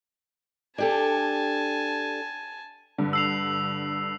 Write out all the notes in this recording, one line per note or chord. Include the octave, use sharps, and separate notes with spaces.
D4 G4 A4 G#5 A5
G2 D3
E6 C7 F7